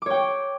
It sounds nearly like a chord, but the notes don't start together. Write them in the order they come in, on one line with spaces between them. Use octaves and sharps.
D6 C#5 G5